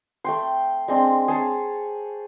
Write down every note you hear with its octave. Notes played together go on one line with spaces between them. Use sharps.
A3 G5 C6
G#3 C4 D4
G#4 C5 C#5 A5